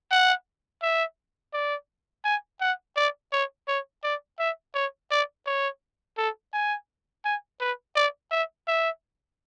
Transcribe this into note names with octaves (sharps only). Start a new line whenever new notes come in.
F#5
E5
D5
G#5
F#5
D5
C#5
C#5
D5
E5
C#5
D5
C#5
A4
G#5
G#5
B4
D5
E5
E5